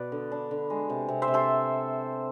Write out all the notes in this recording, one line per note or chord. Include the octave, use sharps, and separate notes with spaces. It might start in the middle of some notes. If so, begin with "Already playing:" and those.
Already playing: B2 B4 D5
D3
D4
D3
G#3
C3
C3
C5 E5
C3
A4 C5